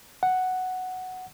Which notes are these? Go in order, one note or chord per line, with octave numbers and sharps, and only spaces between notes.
F#5